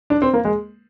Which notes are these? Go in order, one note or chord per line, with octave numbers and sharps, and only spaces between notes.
D4
C4
A#3
G#3